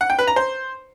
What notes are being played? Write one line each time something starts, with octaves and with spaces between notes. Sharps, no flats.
F#5
G5
B4
A#5
C5